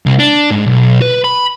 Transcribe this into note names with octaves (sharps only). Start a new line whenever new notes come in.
C2
D4
G#2
B1
B4
B5